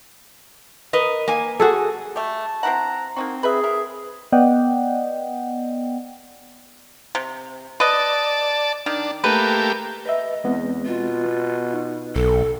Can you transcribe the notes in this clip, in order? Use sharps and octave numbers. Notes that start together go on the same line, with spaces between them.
A#4 B4 D#5
A#3 G#5
F#4 G#4 A4
A3 G4 A5
C4 E4 F#5 A#5
A#3 C4 D#4 F#4
G#4 B4 E5
A#4 E5
B3 D5 D#5 F#5 G5
C3
B4 D5 D#5 A5
D#3 D4
A3 A#3 G4 B4
B4 D#5 E5
E2 G#3 B3 C4
B2 F4
B3
D#4
B1 A4